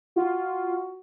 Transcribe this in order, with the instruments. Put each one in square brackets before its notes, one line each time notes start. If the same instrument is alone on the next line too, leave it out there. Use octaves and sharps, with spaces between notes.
[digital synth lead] F4 [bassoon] F#4